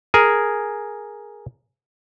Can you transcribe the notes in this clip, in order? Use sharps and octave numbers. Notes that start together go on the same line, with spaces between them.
G#4 A#4 G#5